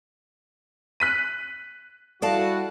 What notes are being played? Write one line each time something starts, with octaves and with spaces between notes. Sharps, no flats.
F#6 B6 D#7
G3 E4 F#4 A4 D5 F5 A5